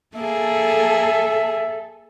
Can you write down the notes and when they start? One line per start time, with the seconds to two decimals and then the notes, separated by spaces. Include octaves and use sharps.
0.16 A#3 G#4 A4 E5